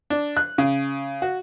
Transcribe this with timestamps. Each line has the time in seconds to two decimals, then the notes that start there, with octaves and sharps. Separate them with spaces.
0.10 D4
0.37 F#6
0.58 C#3
1.22 F#4